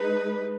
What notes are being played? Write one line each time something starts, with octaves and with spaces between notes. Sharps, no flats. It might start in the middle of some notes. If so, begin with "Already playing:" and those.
Already playing: G#3 D#4 B4